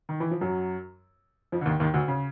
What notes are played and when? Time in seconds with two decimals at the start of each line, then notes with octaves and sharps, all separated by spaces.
0.09 D#3
0.20 E3
0.31 F3
0.41 F#2 F#3
1.52 F2 F3
1.61 D3
1.66 D#2 D#3
1.80 D#2 D#3
1.94 D2 D3
2.08 C#3